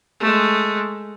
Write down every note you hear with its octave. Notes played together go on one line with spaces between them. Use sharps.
G#3 A3